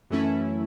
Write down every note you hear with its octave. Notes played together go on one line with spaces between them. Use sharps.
F#2 E3 A3 C#4 E4